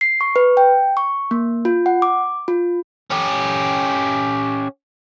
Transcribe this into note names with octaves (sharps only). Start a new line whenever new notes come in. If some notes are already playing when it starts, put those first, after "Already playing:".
C7
C#6
B4
G5
C#6
A#3
F4
F#5
D6
F4
C#4 G4